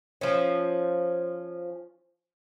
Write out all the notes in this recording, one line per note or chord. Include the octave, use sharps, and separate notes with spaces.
F3 C#4